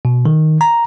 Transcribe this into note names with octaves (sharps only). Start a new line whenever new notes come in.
B2
D#3
A#5